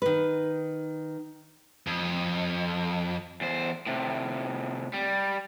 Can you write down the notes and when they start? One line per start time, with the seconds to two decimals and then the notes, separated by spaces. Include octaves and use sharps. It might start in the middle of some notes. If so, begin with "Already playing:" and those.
0.02 D#3 B4
1.87 F2
3.41 E2 C5
3.86 A2 C3
4.94 G3